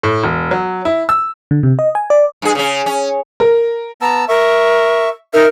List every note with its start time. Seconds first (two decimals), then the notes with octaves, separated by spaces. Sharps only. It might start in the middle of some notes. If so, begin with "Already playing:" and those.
0.03 A2
0.23 E1
0.51 F#3
0.85 E4
1.09 E6
1.51 D3
1.63 C3
1.79 D#5
1.95 G#5
2.10 D5
2.42 G2 G#4
2.55 C#3 C#4
2.86 C#4
3.40 A#4
4.02 B3 A5 A#5 E6
4.29 A#4 E5 C#6
5.34 D#4 A#4 E5 F6